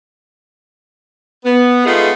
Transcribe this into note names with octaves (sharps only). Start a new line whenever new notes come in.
B3
G#3 A3 B3 D#4 F4 G#4